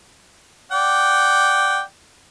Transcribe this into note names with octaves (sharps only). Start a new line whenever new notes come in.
D5 F#5 G5